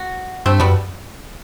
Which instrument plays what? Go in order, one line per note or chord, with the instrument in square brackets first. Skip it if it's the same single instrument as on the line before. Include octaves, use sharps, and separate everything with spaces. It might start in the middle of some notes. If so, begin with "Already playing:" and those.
Already playing: [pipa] F#4
[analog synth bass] G2 [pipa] A3 C4
[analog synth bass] F#2 [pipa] G3 B3